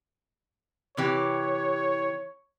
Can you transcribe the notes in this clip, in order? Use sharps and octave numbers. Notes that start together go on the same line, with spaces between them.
C3 E3 G4 C#5